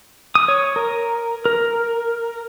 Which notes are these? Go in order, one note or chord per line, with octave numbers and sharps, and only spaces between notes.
D#6
C#5
A#4
A#4